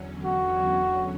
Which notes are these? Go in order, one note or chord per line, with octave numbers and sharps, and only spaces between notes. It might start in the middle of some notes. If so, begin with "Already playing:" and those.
Already playing: E2 D3 F#3 C#4
F#4